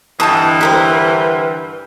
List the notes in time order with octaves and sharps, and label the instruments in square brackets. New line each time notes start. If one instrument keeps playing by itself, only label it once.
[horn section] G2 D3 E3 [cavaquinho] D#4 A5 D#6
[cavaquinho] G4 A#4 C5